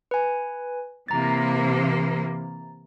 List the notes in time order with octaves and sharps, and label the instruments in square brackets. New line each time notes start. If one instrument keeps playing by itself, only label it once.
[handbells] B4 G#5
[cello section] C3 E3 A#3 [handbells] A#5 A6